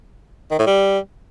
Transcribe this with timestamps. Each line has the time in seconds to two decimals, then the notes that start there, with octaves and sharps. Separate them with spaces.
0.51 D#3
0.59 A2
0.67 G3